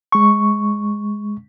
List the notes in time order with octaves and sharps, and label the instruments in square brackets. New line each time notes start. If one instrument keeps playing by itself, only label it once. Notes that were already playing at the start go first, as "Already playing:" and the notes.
[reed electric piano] G#3 C#6